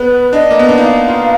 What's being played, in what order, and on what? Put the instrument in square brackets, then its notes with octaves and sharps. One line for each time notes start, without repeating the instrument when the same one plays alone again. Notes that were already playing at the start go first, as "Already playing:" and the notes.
Already playing: [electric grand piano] B3 [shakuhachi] B4
[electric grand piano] D4 [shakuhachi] D#5
[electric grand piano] A#3
B3
D4
[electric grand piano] D#4 [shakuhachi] F5
[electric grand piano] F4